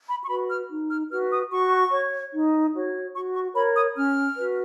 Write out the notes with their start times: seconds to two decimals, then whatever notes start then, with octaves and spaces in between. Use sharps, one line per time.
0.08 B5
0.23 C#6
0.29 F#4 B4 B5
0.49 F6
0.70 D#4
0.90 F6
1.11 F#4 B4 F6
1.31 D#6
1.51 F#4 C#6
1.92 C#5
2.33 D#4
2.73 F#4 C#5
3.14 F#4 C#6
3.34 C#6
3.55 A#4 C#5 B5
3.75 D#6
3.95 C#4 F6
4.36 F#4 B4